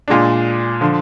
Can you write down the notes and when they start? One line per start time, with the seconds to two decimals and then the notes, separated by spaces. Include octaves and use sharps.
0.08 A#2 G#3 D4
0.81 D3 F3